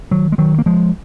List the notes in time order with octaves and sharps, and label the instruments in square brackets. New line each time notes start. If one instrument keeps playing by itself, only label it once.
[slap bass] D#3 F#3
G#3
D#3 F#3
A#3
F3 G#3